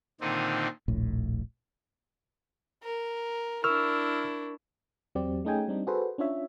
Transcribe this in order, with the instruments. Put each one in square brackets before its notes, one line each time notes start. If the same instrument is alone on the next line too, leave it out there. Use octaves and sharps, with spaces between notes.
[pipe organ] A#2 D3 D#3 C4 D#4
[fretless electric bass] D#1 A#1 A2
[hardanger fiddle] A#4
[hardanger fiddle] D4 E4 [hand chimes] A#4 C#6 [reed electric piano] E6 F6
[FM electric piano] E2 F#3 C4 G4 D5
A3 C#4 D#4 G#4 G5 G#5
G3 C4 D4 D#4
F#4 G#4 A4 B4 C5
C#4 D4 F4 C#5 E5